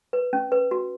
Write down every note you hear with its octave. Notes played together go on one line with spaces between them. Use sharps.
B4
C#4
B4
F#4